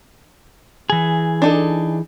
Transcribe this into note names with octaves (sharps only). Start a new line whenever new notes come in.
E3 G#4
D4 D#4 A4